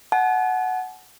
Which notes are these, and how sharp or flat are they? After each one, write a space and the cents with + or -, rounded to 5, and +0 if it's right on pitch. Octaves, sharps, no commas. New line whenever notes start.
F#5 +0 A5 -45